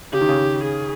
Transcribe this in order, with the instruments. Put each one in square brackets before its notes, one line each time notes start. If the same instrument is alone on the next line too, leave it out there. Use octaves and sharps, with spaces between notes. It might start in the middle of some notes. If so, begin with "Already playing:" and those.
[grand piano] C#3 [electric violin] G4
[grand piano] D#3
C#3
[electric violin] G#4